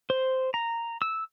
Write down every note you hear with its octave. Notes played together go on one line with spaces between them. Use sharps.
C5
A#5
E6